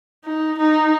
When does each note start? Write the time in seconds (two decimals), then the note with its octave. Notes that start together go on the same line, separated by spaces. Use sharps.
0.25 D#4
0.58 D#4